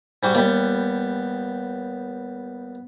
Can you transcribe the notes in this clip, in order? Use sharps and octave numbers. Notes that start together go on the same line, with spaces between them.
G#2 G3 F#4
D#2 G3 B3